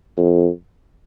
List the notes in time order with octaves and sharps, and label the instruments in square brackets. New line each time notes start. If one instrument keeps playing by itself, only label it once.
[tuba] F2